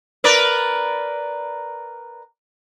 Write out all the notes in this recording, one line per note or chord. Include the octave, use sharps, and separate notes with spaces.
A#4 B4 D5